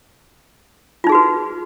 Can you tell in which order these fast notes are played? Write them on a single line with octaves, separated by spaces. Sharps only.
F4 D#4 G#4 F#4 B4